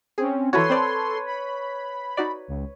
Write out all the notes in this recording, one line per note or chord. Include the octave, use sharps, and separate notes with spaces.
C4 C#4 G#4
E3 E4 F#4 A4 B4 C#5 C6
C4 C5 D5
B5
D#4 F#4 D5
C#2